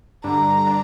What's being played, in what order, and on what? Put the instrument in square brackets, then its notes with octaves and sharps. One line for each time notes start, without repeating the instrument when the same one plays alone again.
[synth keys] G2 D3 G3 D4 [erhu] A#5
[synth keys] D4